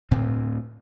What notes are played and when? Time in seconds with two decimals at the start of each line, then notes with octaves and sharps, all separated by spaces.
0.11 D2 A2 C4